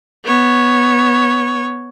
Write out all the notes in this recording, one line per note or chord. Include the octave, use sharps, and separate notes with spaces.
B3 C#5